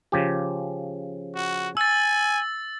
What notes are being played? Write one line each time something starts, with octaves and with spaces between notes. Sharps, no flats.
C#3 F3 G4
F#4
G#5 E6 A6